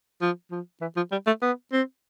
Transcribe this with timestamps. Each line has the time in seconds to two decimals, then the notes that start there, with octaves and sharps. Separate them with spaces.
0.22 F3
0.51 F3
0.81 E3
0.97 F3
1.12 G3
1.27 A3
1.42 B3
1.73 C4